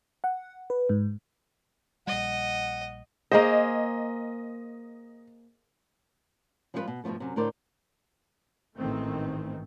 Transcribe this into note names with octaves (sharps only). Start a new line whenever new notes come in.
F#5
B4
G#2
A#1 G3 D#5 F#5
A#3 G#4 C5 D#5
F3 G3 G#3 E4 F4 B4
B2
G2 B2 D#3 F3 A3
F#2 C3
A2 D3 A#4 C5 D5
A1 G#2 D#3 E3 A3 C4